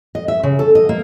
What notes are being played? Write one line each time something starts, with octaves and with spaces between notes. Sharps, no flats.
D#5
E5
C#3
A4
D#5
A#3